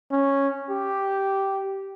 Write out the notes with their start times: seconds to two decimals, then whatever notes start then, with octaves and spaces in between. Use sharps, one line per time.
0.12 C#4
0.70 G4